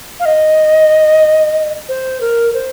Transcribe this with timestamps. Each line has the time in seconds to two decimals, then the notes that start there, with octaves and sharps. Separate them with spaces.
0.20 F5
0.25 D#5
1.89 C5
2.21 A#4
2.54 C5